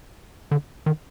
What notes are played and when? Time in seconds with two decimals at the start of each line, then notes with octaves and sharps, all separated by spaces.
0.51 D3
0.86 D#3